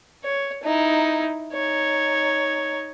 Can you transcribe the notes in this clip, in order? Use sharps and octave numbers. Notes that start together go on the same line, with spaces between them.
C#5
D#4 E4
D#4 C#5